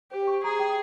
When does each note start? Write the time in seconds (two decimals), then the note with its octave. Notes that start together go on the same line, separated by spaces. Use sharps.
0.11 G4 C5
0.27 C#6
0.44 G#4 A#5
0.59 G5